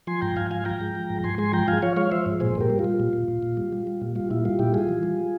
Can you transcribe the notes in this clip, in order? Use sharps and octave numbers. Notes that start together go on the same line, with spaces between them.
F3 G#5 C6
G#2 G5 A#5
G#2 F5 G#5
F3 F5 G#5
F3 G5 A#5
G#3
F3
G#2
G#2 G#5 C6
G#3 G#5 C6
F3 G5 A#5
F3 F5 G#5
F3 C#5 F5
G#3 C#5 F5
F3 C5 E5
G#2
A#2 G#4 C5
A#2
G4 A#4
G3
F4
G3
A#2
A#2
A#2
A#2
G3
G3
G3
A#2
G3 F4
A#2 E4
G3 F4
A#2 E4 G4
G3 F4 G#4
E3
G3